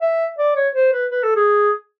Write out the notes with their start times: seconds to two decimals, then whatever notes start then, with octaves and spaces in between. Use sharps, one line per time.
0.02 E5
0.39 D5
0.56 C#5
0.75 C5
0.93 B4
1.11 B4
1.23 A4
1.36 G#4